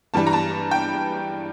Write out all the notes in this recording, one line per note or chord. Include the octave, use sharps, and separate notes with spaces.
G2 E3 G3 A5
A#5
A5
G5